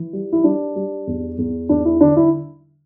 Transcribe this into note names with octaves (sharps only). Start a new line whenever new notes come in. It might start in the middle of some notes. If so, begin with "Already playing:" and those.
Already playing: E3
G3
E4
G3 D4
G3
E2
E2
E2 D4
E4
D3 D4
E4